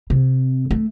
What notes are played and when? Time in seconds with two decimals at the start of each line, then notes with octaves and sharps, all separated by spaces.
0.10 C3
0.71 A3